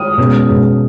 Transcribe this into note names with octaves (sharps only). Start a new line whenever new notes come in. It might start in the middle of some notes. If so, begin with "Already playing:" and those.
Already playing: D#6 F6
B2 G#3 C#4
B2 G#3 C#4